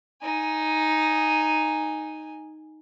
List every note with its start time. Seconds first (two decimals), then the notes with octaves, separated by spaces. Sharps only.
0.22 D#4 G#5